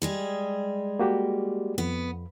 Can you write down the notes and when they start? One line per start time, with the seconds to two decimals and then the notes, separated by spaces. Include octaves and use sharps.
0.02 G3 G#3 G#4
0.99 A#3 F#4 G4
1.78 F2 B3